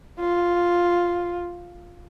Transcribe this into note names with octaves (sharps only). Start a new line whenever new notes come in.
F4